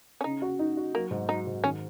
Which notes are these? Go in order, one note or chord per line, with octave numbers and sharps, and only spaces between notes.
C#4
C#3 D#4
F#4
D#4
F#4
F#3 A#3
G#2
F#3 D#4
G#2
D#3 C#4